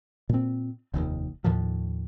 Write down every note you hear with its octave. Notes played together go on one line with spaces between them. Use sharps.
A#2 C4
F1 D#2 B2 D#3
D#2 A2 D#3 F3